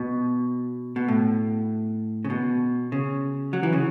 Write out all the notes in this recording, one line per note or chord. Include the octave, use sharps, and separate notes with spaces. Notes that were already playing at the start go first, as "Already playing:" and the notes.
Already playing: B2
B2
A2
C#3
B2
C#3
F#3
E3
C#3